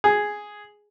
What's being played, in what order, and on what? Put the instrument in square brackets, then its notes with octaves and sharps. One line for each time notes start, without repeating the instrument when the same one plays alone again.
[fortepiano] G#4